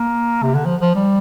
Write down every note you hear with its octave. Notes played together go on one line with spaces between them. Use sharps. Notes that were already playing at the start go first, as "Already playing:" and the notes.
Already playing: A#3
C3
D3
F3
F3
G3